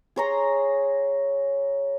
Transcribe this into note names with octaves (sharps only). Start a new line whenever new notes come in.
G#4 C#5 A#5 C6